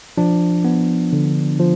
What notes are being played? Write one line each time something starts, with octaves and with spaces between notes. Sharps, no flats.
F3 D4
B3
D3
F3